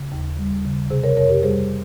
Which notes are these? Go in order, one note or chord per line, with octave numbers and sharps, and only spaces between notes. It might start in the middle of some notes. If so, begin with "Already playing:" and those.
Already playing: C#3
D#2
G3
C#3
C3 G#4 C5
A#4 C#5
F2 A#4 C#5
G4 A#4
G3 G#4 C5